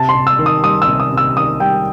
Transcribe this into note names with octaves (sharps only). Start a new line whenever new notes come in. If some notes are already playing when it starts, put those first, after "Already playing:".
Already playing: C3 A5
C6
C3
E6
D#3
D#6
G3 D#6
E6
C3
D#6
C3 E6
D#3 D#6
G3 G5